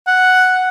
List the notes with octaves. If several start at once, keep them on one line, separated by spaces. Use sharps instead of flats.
F#5